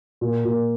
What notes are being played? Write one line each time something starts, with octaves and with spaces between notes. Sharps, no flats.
A#2
A#2